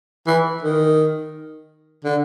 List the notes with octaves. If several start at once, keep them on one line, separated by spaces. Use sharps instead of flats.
E3
D#3
D3